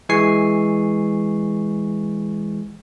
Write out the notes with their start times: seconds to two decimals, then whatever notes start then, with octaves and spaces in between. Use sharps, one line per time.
0.09 E3 G#3 G#5 C#6 C7